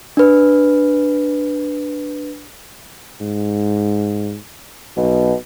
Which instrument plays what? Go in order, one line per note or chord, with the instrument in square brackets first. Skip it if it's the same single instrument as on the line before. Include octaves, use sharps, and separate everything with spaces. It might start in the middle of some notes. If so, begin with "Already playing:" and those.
[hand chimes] D4 B4
[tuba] G#2
[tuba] B1 [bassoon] B2